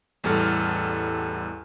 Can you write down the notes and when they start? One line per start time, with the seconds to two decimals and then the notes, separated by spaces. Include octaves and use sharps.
0.24 A1 E2 G3 A4 F6